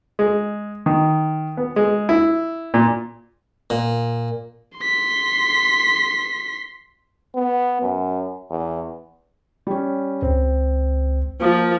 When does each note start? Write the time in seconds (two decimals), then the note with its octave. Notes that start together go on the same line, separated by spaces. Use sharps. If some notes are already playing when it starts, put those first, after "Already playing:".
0.19 G#3
0.86 D#3
1.57 B3
1.76 G#3
2.09 E4
2.74 A#2
3.70 A#2
4.78 C6 B6
7.35 B3
7.82 F#2
8.50 E2
9.67 G3 C#4
10.22 C#2 C4
11.41 F3 A#3